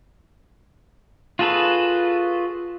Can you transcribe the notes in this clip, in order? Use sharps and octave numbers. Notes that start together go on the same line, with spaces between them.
F4 F#4 G#4 A4 B4